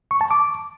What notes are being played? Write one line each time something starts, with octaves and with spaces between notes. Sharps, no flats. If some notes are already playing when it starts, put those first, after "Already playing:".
C#6
A5
D6